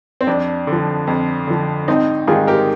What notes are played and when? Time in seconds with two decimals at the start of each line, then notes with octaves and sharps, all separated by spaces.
0.21 C4
0.27 F2 D4
0.67 D3
0.72 F3
1.07 F2
1.47 D3 F3
1.88 G#1 C4 D#4
2.27 G#2 D#3 G3 F4 G#4
2.47 G4 A#4